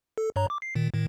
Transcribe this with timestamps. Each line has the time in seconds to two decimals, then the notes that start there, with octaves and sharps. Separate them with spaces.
0.18 A4
0.36 G2 C#5 A#5
0.50 D6
0.62 C7
0.75 A#2 D#3
0.94 A2 D#3